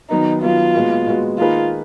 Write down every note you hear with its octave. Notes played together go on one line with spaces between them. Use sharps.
D#3 F#3 B3 D#4
D#3 F#3 B3 F4
A#2 G#3 B3 F#4
A#2 G#3 B3 F#4
D#3 A#3 D#4 F4 G#4 B4